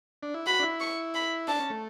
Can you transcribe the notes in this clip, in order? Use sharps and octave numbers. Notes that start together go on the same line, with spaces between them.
D4
E4
F#4 B5
D4
E4
C#6
B5
D4 A5
C#4
A3